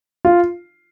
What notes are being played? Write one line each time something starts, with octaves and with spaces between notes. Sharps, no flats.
F4